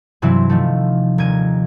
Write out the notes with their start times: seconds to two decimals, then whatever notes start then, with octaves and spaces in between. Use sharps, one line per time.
0.22 G2 C3 E3 F#3 C4 E4
0.49 D#3 F3 A3
1.18 D#1 A#4 G#6 D#7